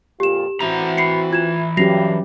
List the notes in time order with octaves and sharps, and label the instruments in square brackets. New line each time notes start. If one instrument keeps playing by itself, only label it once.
[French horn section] F2 A#2 F4 [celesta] G4 E7
[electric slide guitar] E3 E4 A#5 [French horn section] C4 F#4 [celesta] F7
[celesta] B5 C7 C#7
F4 G#6 E7
[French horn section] G2 [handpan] F#3 C#4 G4 [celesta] A#6 C7 F7